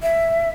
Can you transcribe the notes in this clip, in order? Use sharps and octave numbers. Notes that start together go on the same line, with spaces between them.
E5